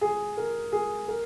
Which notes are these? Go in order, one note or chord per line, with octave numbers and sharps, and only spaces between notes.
G#4
A#4
G#4
A#4